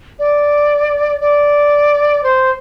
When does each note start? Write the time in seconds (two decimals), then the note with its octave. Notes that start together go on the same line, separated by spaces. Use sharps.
0.19 D5
1.21 D5
2.23 C5